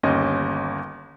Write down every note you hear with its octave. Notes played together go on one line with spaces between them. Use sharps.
G1 D#2 C#4 D#5